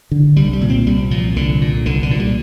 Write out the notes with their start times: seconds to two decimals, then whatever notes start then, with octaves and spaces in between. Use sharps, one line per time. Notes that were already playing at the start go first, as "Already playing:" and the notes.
0.11 D3
0.36 C2 G3
0.53 G3
0.61 A#2
0.70 C4
0.86 C2 G3
1.11 A#2 F3
1.36 C2 D3
1.61 A#2
1.86 C2 D3
2.03 D3
2.11 A#2
2.20 G3